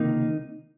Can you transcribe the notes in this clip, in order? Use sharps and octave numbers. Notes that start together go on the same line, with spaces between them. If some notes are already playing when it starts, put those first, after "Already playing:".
Already playing: C#2 C3 D#3 A#3 D#4